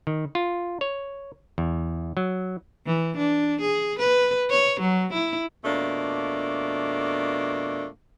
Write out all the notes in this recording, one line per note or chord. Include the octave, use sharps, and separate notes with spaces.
D#3
F4
C#5
E2
F#3
E3
D4
G#4
B4
C#5
F#3
E4
F2 B2 A3 A#3 D4